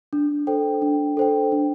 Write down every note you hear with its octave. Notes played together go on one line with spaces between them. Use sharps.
D4
A4 C5 G5
D4
A4 C5 G5
D4